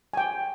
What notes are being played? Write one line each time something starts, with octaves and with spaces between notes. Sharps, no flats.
G#5
G5